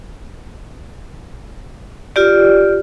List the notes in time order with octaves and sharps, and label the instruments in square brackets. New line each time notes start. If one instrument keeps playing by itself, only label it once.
[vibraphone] F4 G4 D5